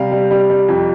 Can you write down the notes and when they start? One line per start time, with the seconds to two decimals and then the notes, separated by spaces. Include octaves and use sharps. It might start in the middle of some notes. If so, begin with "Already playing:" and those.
Already playing: C3 G3 F5
0.12 G3
0.31 G3
0.50 G3
0.69 F2